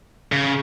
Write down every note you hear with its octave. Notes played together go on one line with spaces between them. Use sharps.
C#3